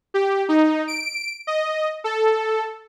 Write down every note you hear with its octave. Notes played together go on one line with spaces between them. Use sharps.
G4
D#4
D7
D#5
A4